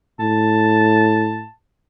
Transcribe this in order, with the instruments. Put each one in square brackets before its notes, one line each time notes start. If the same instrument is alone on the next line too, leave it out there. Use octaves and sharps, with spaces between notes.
[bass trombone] A2 [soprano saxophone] A5